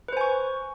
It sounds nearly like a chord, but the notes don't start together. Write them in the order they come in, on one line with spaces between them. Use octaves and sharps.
B4 C5 G#5 C#6